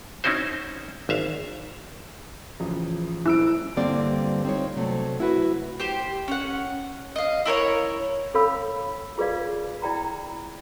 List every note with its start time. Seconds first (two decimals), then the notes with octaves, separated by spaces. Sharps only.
0.24 C4 C#4 D#4 E4 F#4 C5
1.09 G#1 E5 F5
2.60 A1 C#3 F3
3.26 D#1 E4 E6 D7
3.76 G2 D3 G3 A#3 C4 D5
4.45 C4 D#4 F4 C#5
4.76 C3 F#3 A3 C4
5.20 E4 F#4 B4
5.80 G4 C5
6.28 C#4 F#5
7.16 D#5 F5
7.45 E4 A#4 C5 C#5
8.34 C#4 A4 C#5 F5 B5 E6
9.18 F4 G#4 B4 D5 F5
9.82 E4 D5 G5 A#5 B5